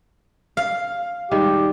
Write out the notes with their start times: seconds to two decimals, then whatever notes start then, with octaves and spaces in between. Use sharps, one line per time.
0.57 F5
1.31 D#3 G3 G#3 G4